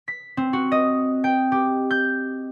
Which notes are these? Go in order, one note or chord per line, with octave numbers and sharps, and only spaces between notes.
B6
C4
F#4
D#5
G5
G4
G6